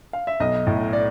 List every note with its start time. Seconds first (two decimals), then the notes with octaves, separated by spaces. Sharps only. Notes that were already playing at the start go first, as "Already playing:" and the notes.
0.13 F5
0.27 E5
0.40 B1 D#5
0.67 A2
0.93 D5